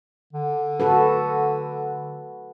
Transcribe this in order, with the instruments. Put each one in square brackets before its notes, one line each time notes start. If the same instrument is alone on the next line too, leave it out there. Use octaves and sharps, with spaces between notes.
[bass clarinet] D3
[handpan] F#4 A4 B4